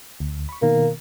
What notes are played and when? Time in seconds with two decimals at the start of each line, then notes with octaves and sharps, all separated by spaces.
0.20 D2
0.49 B5 C#6
0.62 B2 D#3 A#3